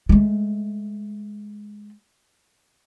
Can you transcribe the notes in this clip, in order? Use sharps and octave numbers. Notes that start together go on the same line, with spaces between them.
G#3 A3